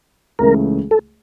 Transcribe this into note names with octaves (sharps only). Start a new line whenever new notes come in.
C#2 C#3 E3 A3 A#4
A4